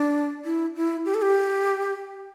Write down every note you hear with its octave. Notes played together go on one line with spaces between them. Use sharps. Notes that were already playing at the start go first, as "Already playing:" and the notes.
Already playing: D4
E4
E4
G4
A4
G4